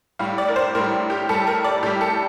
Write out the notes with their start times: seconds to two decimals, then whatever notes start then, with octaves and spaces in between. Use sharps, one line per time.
0.19 A2 G3 F5
0.38 D5
0.49 A#4
0.56 C5
0.75 A2 G3 A#4
1.10 G4
1.29 A2 G3 A4
1.47 A#4
1.64 D5
1.83 A2 G4
1.86 G3
2.01 A4